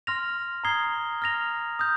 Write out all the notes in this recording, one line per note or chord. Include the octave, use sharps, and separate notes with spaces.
C6 F6 A#6 F7
A#5 D#6 G#6 C7 G7
F6 A#6 F7
D#6 G6